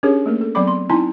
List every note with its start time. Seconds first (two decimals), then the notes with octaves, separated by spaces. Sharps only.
0.03 C#4 D4 G4 G#4 A#4 C#5
0.26 A3 A#3 A#4
0.41 A4
0.55 F#3 B3 C4 D5 B5 D6
0.67 C6
0.90 C4 D#4 E4 G#5 A5 C6